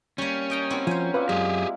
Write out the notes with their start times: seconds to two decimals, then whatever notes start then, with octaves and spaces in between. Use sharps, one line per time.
0.18 G3 A#3 C#4
0.50 D#5 G5 A#5
0.70 C4 E4 F#4 A#4 G5
0.87 F3 C5 G#5
1.14 F4 B4 D5 E5
1.29 F#2 G#3 G4 G#4